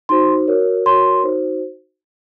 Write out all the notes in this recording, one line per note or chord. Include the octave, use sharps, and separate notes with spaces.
D#4 F#4 C5 C6
F#4 A#4 C#5
F#4 A#4 C#5 C6
D#4 F#4 C5